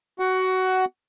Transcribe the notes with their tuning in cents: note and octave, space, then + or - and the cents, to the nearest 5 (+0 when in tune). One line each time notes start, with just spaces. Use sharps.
F#4 +15 F#5 +15